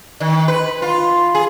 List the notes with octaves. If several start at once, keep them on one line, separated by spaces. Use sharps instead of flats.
D#3
B4
F4
G#4